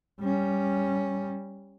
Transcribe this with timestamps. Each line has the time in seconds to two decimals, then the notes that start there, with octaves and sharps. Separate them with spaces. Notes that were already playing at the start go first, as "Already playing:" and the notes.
0.21 G3 C#4